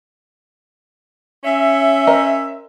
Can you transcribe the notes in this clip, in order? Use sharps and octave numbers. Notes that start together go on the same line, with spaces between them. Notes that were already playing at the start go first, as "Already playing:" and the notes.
C#4 E5
A#4 C5 D#5